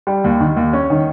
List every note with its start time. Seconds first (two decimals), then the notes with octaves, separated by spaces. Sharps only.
0.07 G3
0.24 D#2
0.40 D#3
0.56 D#2
0.73 C#4
0.90 D#3